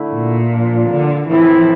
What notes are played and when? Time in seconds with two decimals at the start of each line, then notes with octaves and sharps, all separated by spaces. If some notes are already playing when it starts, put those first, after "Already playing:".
Already playing: D3 A3 E4
0.14 A#2
0.51 F3 A#3 D4 F4
0.90 D3
1.28 A2 E3 F3 C4 E4